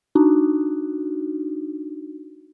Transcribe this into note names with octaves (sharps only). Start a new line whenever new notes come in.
D4 D#4 F#4